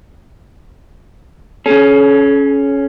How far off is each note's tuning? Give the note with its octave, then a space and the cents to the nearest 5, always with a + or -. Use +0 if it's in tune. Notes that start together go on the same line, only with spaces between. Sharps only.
C#4 +5 G#4 +45